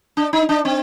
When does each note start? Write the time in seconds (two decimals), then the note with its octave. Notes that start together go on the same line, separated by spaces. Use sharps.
0.17 D4
0.33 D#4
0.49 D4
0.65 C4